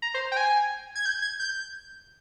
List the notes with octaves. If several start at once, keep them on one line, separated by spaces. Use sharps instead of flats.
A#5
C5
G5
G#5
G#6
G6
G#6
G6